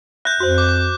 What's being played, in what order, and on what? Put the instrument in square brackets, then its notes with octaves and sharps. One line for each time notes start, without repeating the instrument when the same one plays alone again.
[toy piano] E5 [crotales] F#6 G6
[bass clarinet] F2 [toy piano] F#4 C5
[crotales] D6